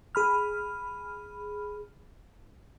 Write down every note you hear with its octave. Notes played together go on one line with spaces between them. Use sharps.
G#4 B5 F6